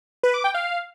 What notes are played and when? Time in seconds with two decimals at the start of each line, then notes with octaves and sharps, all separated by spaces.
0.23 B4
0.34 D6
0.44 G5
0.54 F5